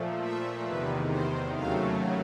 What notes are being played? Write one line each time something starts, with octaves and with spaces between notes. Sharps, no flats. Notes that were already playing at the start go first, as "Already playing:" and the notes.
Already playing: A#2 F3 A3
E5
E2 C3 D#3 B4
C5
D#2 C#3 F#3 A3 F5